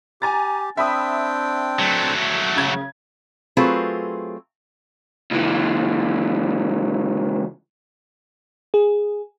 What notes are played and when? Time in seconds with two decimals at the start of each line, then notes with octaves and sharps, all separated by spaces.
0.22 G4 G#5 A#5 A6
0.77 C4 D4 E5 G5 B5 D#6
1.79 F#3 A3
2.55 F#2 C#3 G#6
3.57 F#3 A3 C4 F4 G#4 B4
5.31 C#2 E3
8.74 G#4